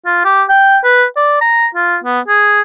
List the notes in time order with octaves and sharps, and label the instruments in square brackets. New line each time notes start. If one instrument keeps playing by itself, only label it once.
[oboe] F4
G4
G5
B4
D5
A#5
F4
B3
G#4